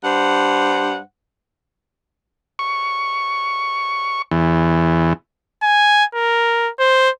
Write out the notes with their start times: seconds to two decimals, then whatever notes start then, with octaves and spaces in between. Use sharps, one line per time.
0.04 G2 C5 F#5
2.59 C#6
4.31 E2
5.63 G#5
6.15 A#4
6.80 C5